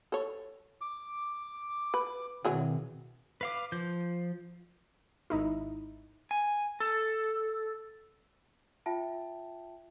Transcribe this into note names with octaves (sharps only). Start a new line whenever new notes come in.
A4 C#5
D6
B4
B2 D#3 E3 F#3 C4 G#4
B4 F5 D6
F3 G6
G#1 D#4 E4
G#5
A4
F4 E5 G5 A5